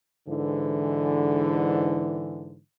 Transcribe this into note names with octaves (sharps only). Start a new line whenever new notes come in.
G#2 D3 E3